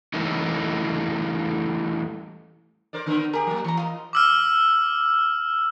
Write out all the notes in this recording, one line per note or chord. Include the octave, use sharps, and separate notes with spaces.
E3 G3 A3 C#4 D#4
A#4 C5 D5
D3 B3 A#4
G4 G#4 A#4
F#3 A#3
E3 A#5 C#6
F4 D#5
D6 E6 F6